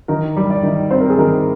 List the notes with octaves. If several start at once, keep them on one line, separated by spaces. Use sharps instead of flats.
D#3 A#4
G3
D5
D#3
C4 C5
A#4
G#4
D#3 A#4